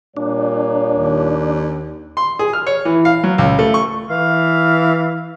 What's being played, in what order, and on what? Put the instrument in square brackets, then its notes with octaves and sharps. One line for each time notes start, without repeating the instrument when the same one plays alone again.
[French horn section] A#2 G3 C#5 [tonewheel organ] D4
[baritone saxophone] D#2
[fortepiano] C6
G#4
F6
C#5
E3
F5
F#3
C#2
A3
C#6
[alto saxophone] E3 [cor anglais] F5